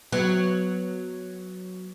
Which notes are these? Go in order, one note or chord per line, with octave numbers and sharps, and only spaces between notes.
F#3 B3